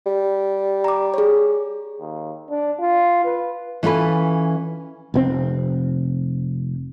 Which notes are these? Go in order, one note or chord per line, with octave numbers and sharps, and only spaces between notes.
G3
A#5 D6
G#4 C#5
D#2
D4
F4
B4
E3 C#4 F4 A4 B4
F1 A2 C4